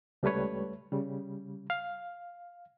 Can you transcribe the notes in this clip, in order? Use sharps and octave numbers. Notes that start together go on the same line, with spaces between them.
C#2 G3 A3 B4 C#5
C#3 G3
F5